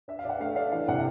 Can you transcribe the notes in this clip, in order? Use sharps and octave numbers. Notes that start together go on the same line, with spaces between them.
D4 E5
F5
D4 F#5
A3 F5
D4 F5
E3 F5
C3 F#5